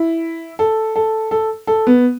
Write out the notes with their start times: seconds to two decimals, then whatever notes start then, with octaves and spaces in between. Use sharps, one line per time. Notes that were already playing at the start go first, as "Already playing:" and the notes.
Already playing: E4
0.59 A4
0.96 A4
1.31 A4
1.67 A4
1.87 B3